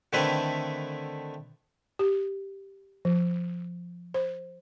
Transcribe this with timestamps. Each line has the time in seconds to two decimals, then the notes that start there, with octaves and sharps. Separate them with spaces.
0.13 D3 D#3 A3 C4 E4 B4
1.99 G4
3.05 F3
4.14 C5